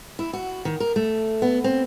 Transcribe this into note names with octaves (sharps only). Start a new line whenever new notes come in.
E4
F#4
D#3
A#4
A3
B3
C4